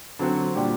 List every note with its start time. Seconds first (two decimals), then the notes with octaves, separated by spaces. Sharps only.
0.19 D3 F#3 C4 F#4
0.55 A#2 G3 D4 G4